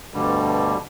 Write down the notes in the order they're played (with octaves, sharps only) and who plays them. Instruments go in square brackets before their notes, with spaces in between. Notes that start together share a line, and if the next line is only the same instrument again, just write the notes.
[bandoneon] D2 G2 B2 D3 G3